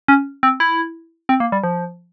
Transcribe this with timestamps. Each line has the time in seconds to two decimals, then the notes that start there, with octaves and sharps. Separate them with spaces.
0.08 C#4
0.43 C4
0.60 E4
1.29 C4
1.40 A#3
1.52 G3
1.64 F3